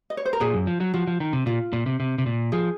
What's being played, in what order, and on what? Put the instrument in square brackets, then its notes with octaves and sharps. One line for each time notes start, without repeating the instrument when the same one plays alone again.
[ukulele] D#5
C#5
C5
A#4
[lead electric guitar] A#2 [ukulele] G#4
[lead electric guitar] F#2
F3
F#3
[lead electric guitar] F3 [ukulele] F#4
[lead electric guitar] F3
D#3
C3
[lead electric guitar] A#2 [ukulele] F4
[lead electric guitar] A#2
C3
C3
C3
A#2
[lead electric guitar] F3 [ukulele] G#4